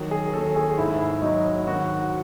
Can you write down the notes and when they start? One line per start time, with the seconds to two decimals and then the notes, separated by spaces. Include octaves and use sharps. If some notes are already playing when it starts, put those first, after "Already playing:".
Already playing: D#3 F#3
0.11 G#4
0.33 D#2 A4
0.56 G#4
0.77 G#2 E4
1.22 F#3 D#4
1.67 D#3 F#4